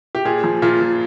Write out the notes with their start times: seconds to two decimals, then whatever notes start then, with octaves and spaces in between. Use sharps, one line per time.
0.15 G4
0.25 A#2 G#4
0.44 F3
0.62 A#2 F4
0.81 A#2